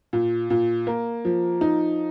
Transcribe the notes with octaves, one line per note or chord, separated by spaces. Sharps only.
A#2
A#2
A#3
F3
D#4